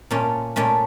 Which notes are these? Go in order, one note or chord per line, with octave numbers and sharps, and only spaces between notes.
A#2 A3 C#4
A#2 A3 C#4